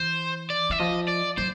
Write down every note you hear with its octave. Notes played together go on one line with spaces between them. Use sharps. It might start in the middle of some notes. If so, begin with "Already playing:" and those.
Already playing: E3 C5
D5
E3 E5
F3 D#5
D5
F#3 C5